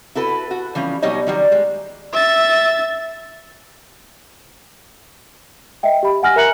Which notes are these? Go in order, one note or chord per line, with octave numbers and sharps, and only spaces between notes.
E4 F#4 A4 B4
F#4
E3 F3 G3 C#4
B2 F#3 G3 D#4 C#5 D#5
D#3 F#3 G3
G#3
E5 A6
D#5 E5 G5
G4 B5
F#5 G#5 F6 A#6
A#4 E5 A#5 F#6 C#7 F#7